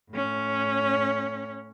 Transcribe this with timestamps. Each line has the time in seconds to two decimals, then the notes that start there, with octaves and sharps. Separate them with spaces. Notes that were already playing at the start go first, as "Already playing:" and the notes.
0.11 A2 C#4